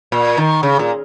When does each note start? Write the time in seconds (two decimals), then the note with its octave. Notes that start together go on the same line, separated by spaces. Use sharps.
0.12 A#2
0.37 D#3
0.63 C#3
0.79 A#2